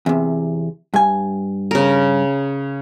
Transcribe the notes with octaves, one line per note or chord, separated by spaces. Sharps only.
E2 C3
G2 G#5
C#3 A#4